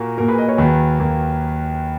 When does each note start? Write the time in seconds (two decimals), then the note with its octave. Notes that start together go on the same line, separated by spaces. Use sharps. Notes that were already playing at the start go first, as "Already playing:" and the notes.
Already playing: A#2 A#3 F#4 A#4
0.18 A#2 A#3 F#4 A#4
0.28 G#4 B4
0.38 B4 D#5
0.48 A#4 C#5
0.58 D#2 D#3 F#3 A#3 G#4 B4
1.00 D#2 D#3 F#3 A#3